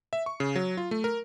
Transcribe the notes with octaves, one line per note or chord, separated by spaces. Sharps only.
E5
C#6
C#3
F#3
F4
A3
A#4